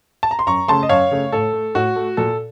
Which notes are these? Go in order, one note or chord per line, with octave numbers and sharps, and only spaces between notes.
A5
A#5
C6
F#2 A#5 C#6
C#3 A3 A5 C6
D#5
F#2 C#5 F5
C#3 A3
A2 A4
A3
A2 F#4
A3
A#2 A4